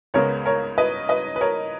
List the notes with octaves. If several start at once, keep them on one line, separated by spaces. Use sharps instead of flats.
C#2 C#3 G#3 B3 A#4 C#5
A#4 C#5
B4 D#5
B4 D#5
B4
A#4 C#5